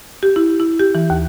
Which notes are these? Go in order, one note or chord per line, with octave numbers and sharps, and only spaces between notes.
G4
E4
E4
G4
E3
D#2